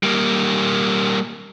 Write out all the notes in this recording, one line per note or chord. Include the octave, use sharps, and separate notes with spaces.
G3 A#3